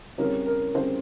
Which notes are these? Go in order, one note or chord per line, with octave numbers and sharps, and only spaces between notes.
C#3 G3 C4 A#4 C#5
A#4
C#3 G3 C4 C5